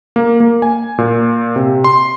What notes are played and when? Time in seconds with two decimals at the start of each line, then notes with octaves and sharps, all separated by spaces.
0.16 A#3
0.40 A#3
0.62 G#5
0.98 A#2
1.56 C3
1.84 C6